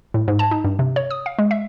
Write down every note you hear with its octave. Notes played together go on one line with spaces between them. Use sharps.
A2
G#2
A5
D#4
G2
C3
C#5
D#6
F5
G#3
E5